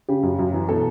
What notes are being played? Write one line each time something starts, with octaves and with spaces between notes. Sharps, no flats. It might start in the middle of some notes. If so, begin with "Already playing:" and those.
C#3 G4
F#2
F#2
E3
B2 A4